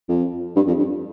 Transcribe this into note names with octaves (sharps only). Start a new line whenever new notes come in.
F2
G2
F2
G2